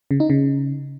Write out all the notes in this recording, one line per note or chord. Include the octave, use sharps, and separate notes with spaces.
C#3
D#4
C#3